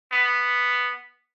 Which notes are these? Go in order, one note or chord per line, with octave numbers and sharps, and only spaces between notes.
B3